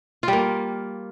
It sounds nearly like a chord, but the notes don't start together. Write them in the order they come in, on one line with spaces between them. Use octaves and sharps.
F4 G3 A#3